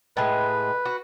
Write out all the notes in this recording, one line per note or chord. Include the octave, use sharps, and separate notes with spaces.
A2 G#3 B4
F#4